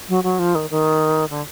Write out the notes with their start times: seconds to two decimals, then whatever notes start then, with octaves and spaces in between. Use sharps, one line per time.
0.09 F#3
0.24 F#3
0.39 F3
0.55 D#3
0.70 D#3
1.30 D3